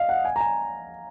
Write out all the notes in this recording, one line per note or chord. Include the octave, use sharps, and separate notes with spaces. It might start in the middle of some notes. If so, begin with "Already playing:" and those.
Already playing: D#5 F5
F#5
G#5
A#5
G#5